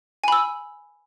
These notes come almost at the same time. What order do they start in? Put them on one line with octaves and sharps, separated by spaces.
G#5 B5 E6